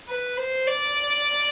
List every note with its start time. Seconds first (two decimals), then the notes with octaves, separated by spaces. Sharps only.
0.08 B4
0.38 C5
0.67 D5